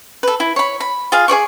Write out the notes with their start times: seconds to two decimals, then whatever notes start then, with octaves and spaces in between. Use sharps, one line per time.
0.23 A4 B4
0.40 E4
0.56 C#5 B5
0.80 B5
1.12 F4 G#4 F5
1.28 G#4 C#5 D5 C#6